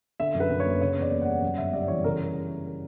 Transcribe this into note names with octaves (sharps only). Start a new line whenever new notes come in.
D3 E5
F#2
B4
F#2
C#5
A#3
C#3 C#5
E2 D5
A#3
F#5
G3
F#2
G1 E5
G3 D5
E3 C#5
C#3 A#4